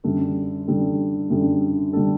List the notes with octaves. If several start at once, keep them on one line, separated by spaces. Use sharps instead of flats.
F#2 D3 G3 D4 A4
F#2 D3 G3 D4 A4
F#2 D3 G3 D4 A4
D3 G3 D4 A4